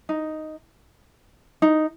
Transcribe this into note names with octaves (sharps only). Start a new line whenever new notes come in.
D#4
D#4